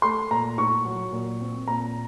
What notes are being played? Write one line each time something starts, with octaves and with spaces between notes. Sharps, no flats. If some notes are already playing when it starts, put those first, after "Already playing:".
A3 C6
A#2 A#5
A2 C#6
F#3
A#2
C4
A#2 A#5